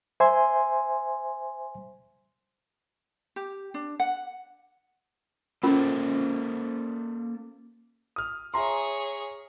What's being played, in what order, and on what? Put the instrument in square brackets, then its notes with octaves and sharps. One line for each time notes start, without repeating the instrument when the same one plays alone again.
[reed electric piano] C5 E5 G#5 C6
[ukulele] G4
D4
F#5
[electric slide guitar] A#3 A4 C5 [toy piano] C#4 F4 A#4
[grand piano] D#6 F6
[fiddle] G#4 C#5 [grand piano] E5 A#5 C6